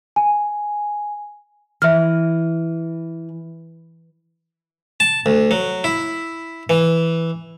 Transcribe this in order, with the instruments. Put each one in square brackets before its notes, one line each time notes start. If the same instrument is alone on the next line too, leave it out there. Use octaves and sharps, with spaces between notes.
[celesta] G#5
[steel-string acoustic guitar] E3 [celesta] E5 F6
[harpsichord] A5
D2
F#3
E4
E3